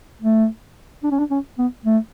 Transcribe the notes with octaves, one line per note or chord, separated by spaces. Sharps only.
A3
D4
C#4
D4
C#4
B3
A3